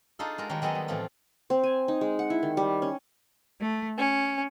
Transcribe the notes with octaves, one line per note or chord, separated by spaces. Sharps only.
D4 D#4 F4 G#4 A4
G#3 F#4 A#4
D#3 G3 G#3 F#4 C#5
F#3 G#3 B3 A4 D#5 G#5
G3
A2 E3 F3 C4 F4 C#5
C4
G#5
D#4
G#3
F#5
E4
D#3
G3
C#4
A3
C#4